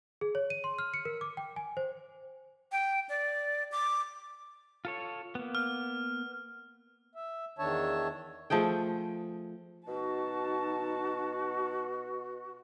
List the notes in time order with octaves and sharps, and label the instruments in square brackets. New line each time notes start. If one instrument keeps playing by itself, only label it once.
[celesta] G#4
C#5
D#7
C6
F6
C#7
A#4
D6
G5
G#5
C5
[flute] G5
D5
D6
[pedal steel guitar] F4 A4 C#5
A#3 B3
[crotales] F6
[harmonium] E5
E2 D#3 D4 C#5 E5 A5
[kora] F3 A3 G#4 G5
[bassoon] B2 [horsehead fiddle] D#4 A5 [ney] F#4